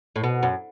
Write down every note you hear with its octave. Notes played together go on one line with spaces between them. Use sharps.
A2
B2
F#2